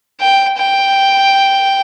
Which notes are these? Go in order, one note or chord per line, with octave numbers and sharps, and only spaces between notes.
G5
G5